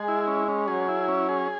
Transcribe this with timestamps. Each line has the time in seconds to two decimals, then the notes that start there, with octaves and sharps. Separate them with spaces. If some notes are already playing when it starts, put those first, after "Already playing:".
Already playing: G#3 G#4
0.08 E4
0.28 C#4
0.48 C#4
0.68 F#3 G#4
0.88 E4
1.08 C#4
1.29 G#4